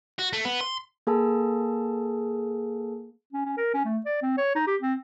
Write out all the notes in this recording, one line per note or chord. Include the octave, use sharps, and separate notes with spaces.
F#4
A3
B3
C6
A#3 G#4 A4 A5
C#4
C#4
A#4
C#4
A3
D5
C4
C#5
D#4
G4
C4